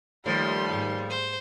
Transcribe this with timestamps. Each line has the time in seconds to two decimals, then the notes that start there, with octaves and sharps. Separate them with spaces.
0.26 D#2 F3 G3 A3 C6
0.68 G#2 G#4 F5
1.10 C5